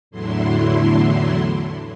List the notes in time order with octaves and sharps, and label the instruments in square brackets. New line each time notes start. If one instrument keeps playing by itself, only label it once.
[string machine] E2 A2 D3 F#3 E4 C6